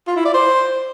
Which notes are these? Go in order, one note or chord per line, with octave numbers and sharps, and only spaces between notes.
F4
E4
D5
C5